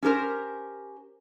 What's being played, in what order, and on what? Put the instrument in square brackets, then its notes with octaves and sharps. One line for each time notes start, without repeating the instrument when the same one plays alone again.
[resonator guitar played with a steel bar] C#4 G4 A4 A#4 C5